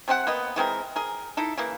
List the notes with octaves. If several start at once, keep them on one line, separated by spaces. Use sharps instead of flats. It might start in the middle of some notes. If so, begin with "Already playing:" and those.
C3 C4 C#4 F#5
A#3 B3 D#5
E3 G#3 C4 A#4
G#4 A#4
D#4 E4 A4
C#3 E3 A#3